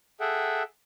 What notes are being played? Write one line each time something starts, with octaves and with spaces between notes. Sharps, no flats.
G#4 A4 E5 F#5 G5